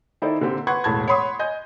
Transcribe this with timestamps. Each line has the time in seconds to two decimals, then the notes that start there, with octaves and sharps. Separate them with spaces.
0.22 D#3 D#4 E4 A4 C5 D5
0.40 A#2 D3 A#3 C4 G4
0.67 B4 F#5 C6 C#6 F#6 G#6
0.84 E1 A2 A5 B5 G#6
1.08 C#5 F#5 B5 C6 D#6
1.39 D#5 G#5 G6